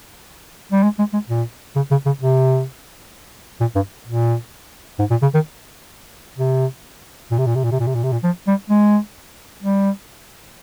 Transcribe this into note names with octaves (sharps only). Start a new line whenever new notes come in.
G3
G#3
G#3
G#3
A#2
C#3
C#3
C#3
C3
A#2
G2
A#2
G#2
A#2
C#3
D#3
C3
A#2
C3
A#2
C3
A#2
C3
A#2
C3
A#2
C3
A#2
F3
G3
G#3
G3